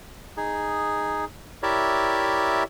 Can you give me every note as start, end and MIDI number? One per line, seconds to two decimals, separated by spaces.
0.37 1.25 63
0.37 1.25 68
1.63 2.63 64
1.63 2.63 67
1.63 2.63 70
1.63 2.63 73
1.63 2.63 74
1.63 2.63 76